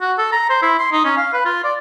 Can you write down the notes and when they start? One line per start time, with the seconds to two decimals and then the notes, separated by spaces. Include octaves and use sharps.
0.01 F#4
0.18 A4
0.33 A#5
0.49 C5
0.62 E4
0.79 C6
0.92 D#4
1.05 C#4
1.17 F5
1.33 B4
1.45 F4
1.64 D5